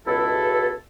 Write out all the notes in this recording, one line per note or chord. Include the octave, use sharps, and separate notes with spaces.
C#2 B2 E4 A4